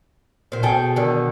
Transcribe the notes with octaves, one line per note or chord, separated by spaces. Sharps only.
A#2 C5
B2 G#4 A4 G5
D3 D#3